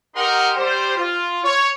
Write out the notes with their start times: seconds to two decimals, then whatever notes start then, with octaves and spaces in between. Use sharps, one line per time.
0.16 D#4 G4 A#4 F#5 C6
0.56 G3 G4 C5
0.96 F4
1.44 C#5